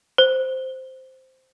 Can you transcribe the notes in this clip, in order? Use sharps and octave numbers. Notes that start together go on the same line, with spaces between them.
C5